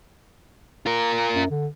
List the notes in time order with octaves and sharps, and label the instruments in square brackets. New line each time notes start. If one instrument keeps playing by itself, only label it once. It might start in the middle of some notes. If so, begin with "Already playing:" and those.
[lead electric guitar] F4 A#4
[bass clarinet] F#2
D3